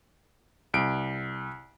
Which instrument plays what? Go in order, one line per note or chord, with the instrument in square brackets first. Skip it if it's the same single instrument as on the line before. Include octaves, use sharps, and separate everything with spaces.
[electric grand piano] C2 D7